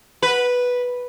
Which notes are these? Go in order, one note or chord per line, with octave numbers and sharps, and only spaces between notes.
B4